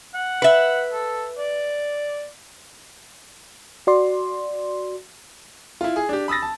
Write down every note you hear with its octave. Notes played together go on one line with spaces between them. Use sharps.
F#5
B4 E5
A4
D5
F#4 D5 C6
E4 F4
G#4
D4 G4
B5 D#6 E6 A6 A#6
A5